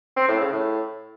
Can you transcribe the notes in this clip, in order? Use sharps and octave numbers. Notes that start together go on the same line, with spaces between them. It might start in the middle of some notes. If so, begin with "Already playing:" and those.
C4
A2
C#3
A2